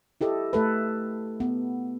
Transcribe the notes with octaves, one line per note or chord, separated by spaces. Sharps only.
E4 G4 A4 D#5
A3 A4 B4
B3